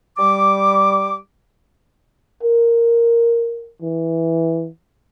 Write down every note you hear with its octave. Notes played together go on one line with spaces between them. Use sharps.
G3 D6
A#4
E3